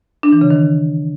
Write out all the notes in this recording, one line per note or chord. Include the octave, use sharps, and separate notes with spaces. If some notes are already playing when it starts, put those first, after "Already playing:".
D4
E3
C#3
D#3